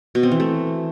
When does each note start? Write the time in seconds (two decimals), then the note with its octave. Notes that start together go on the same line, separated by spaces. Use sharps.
0.15 B2
0.23 C4
0.32 E3
0.40 A3